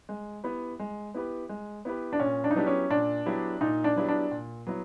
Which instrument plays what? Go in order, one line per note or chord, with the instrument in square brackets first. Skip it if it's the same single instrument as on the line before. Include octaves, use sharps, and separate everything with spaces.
[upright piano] G#3
B3 E4 G4 B4
G#3
B3 E4 G4 B4
G#3
B3 E4 G4 B4
[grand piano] D4
[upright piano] A#2 [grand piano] C#4
[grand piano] D4
D#4
[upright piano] F#3 B3 E4 G4 [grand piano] D4
[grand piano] C#4
[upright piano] A#2 [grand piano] D4
[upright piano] F#3 B3 E4 G4
[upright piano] A#2 [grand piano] D#4
[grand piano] D4
[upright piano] F#3 B3 E4 G4
[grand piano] D4
[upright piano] A#2
F#3 B3 E4